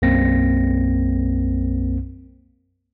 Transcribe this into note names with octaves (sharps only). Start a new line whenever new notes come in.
B1 F#2 A#3 C4 A#6